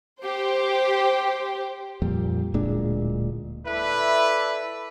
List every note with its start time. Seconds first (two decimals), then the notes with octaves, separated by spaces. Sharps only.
0.21 G4 C5
2.02 F2 A#2 G3
2.54 D1 A#2 G#3 D4
3.66 E4 A4 B4 D5 E5